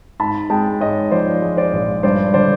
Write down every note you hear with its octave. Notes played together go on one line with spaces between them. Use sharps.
G#2 A5 B5
G#3 G5 A5
G#2 C#5 D#5
F3 C5 D5
G#3
C5 D5
A#1
G2 C5 D5
D3 C5 D5